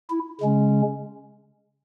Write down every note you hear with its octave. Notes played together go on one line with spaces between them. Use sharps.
E4
C#3 G#3 C#4